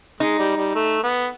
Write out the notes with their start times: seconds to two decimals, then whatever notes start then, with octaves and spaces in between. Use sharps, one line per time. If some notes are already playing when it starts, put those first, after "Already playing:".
0.20 G#3 D#4
0.39 G3
0.57 G3
0.75 A3
1.03 B3